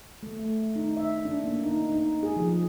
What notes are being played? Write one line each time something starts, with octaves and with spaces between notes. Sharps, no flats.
A3
A3
D#4
E5
D4
A#3
D#4
D#4
G#4
F3